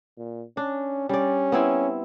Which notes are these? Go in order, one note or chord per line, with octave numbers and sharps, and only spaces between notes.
A#2
C#4 D4
G3 C#4 D5
B3 C4 E4